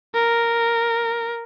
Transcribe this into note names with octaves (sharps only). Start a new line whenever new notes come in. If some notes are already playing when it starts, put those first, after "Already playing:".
A#4